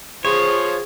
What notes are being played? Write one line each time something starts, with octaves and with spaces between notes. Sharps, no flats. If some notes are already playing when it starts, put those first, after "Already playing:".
F3 F4 G#4 C5 C#5